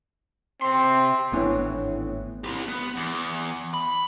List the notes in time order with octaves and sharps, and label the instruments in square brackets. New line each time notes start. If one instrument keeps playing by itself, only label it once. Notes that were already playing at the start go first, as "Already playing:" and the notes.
[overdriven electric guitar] C3 C6 [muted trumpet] C4
[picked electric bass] G#1 B3 D4 [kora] A2 E3 C#5
[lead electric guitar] E4 G4
B3
E2
B5